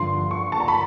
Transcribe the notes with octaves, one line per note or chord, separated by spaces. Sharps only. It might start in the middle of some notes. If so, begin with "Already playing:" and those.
Already playing: G2 D3 F3 C6
C#6
A5
A#5
B5